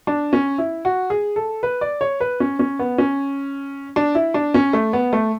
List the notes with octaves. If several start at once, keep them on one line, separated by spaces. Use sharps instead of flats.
D4
C#4
E4
F#4
G#4
A4
B4
D5
C#5
B4
C#4
C#4
B3
C#4
D4
E4
D4
C#4
A3
B3
A3